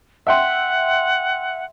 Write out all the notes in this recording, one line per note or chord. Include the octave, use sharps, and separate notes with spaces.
E5 F#5 G5 C6